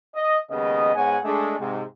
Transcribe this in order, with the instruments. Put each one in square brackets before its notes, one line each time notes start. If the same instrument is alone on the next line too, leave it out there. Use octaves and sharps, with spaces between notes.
[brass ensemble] D#5
D#2 C#3 G#3 B3 D#5
G#2 B3 C#5 F#5 G#5
G#3 A3 D4 G#4
G#2 C3